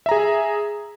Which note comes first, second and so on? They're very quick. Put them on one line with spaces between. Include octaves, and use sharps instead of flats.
E5 A#5 G#4